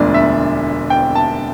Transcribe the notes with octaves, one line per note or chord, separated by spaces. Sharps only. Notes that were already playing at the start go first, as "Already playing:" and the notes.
Already playing: E1 D2 D3 F3 D5
E5
G5
A5